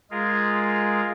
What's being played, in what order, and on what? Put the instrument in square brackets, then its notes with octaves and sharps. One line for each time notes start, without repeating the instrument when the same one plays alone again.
[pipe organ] G#3 F4 G#4 A#4